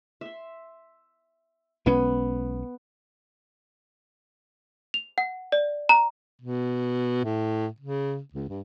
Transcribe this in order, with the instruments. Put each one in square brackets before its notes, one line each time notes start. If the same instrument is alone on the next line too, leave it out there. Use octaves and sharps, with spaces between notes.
[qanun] E5 C6
[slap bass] B1 G#3 C#4 [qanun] B3
[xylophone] F7
F#5
D5
A#5
[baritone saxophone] B2
A2
C#3
C#2
G2